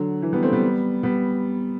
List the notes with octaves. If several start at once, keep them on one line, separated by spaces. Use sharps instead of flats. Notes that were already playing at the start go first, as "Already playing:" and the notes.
Already playing: D3 F#3
E3
G3 B3
A3 C4
G3 B3
G3 B3